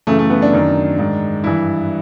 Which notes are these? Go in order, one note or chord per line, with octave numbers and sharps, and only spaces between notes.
F#2 C#3 E3 A3
A3
B3
D4
F#2 D#3
G#2 D#3
G2 E3 E4